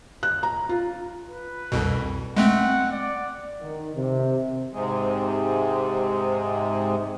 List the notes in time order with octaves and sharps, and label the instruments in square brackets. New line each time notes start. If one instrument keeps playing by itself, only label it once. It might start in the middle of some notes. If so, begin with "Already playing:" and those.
[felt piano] F#6
A#5
F4
[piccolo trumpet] B4
[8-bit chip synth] C2 F2 B2
[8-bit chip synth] G#3 A3 C4 [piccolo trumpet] F#5
[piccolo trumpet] D5
[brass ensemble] D#3
C3
[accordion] G#2 C3 G#3